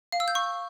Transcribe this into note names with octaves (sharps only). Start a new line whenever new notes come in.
F5
E6
G6
C#6